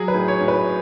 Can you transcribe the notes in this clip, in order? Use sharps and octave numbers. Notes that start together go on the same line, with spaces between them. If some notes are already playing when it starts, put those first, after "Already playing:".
Already playing: F#3 G#4
B4
A2
C#5
A2
B4